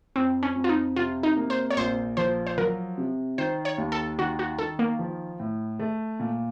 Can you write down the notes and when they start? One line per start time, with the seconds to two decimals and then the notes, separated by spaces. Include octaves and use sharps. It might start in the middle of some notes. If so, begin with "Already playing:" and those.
0.16 F2 C4
0.43 C#4
0.56 F2
0.64 F4
0.69 D#4
0.96 C3 F4
1.23 D#4
1.36 A#3
1.50 C5
1.70 C#5
1.77 A#1 C5
2.17 F3 C5
2.47 C5
2.58 F#3 A#4
2.98 C3
3.38 D#3 C5
3.65 C#5
3.78 D#2
3.92 A4
4.19 D#3 F#4
4.39 F#4
4.59 D#3 A4
4.79 A#3
4.99 F3
5.40 A2
5.80 A3
6.20 A#2